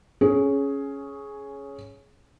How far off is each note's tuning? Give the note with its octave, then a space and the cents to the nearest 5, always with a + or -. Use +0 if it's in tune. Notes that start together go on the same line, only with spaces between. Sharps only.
C#4 +0 G#4 +15